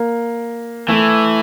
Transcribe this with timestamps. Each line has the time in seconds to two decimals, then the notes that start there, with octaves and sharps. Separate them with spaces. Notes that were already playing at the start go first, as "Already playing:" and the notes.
Already playing: A#3
0.88 E3 A3